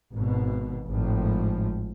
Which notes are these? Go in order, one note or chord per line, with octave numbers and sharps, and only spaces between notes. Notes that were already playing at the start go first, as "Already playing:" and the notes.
G#1 B2
G#1 A2 F3